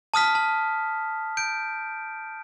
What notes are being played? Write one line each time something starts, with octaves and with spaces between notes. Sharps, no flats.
A5 D#6 F6 B6
A5
G6 D7